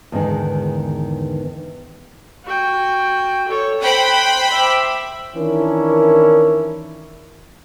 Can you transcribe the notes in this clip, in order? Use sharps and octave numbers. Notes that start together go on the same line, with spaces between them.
E2 G#2 D3 D#3
F#4 G5
A4 C#5
C5 F#5 G5 B5
E5 D6
D#3 E3 C#4 D4 E4 A#4